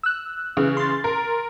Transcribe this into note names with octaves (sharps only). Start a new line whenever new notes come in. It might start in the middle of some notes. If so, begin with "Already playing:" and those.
E6 F#6
C#3 E3
C6 A6
A#4